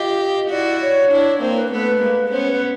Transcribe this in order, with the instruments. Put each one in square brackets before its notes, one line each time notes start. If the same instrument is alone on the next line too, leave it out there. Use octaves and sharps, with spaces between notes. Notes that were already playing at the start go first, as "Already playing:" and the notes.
Already playing: [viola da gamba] F4 G4 [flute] D#5
[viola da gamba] E4 F#4 [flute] D5
[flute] C#5
[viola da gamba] D4 E4
[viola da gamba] A#3 C4 [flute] C5
[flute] B4
[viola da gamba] A3 B3 [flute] B4
[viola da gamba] G#3 A#3
[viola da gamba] B3 C#4 [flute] C5
[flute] B4